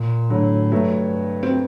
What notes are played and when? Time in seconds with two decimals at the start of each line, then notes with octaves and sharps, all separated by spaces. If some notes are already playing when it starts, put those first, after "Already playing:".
Already playing: A#2
0.30 A2 D3 F#3
0.72 G2 F#3 A3
1.43 C4